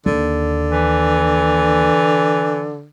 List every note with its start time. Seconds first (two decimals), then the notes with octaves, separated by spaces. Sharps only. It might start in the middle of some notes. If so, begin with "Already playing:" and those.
0.06 D#2 D3
0.71 E3